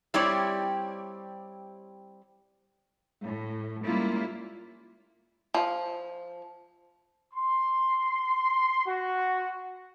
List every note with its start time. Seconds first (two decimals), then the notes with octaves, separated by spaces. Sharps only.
0.14 G3 C4 E4 G4 C#5 D5
3.24 A2
3.84 G3 G#3 A#3 C#4 E4 F4
5.54 F3
7.33 C6
8.86 F#4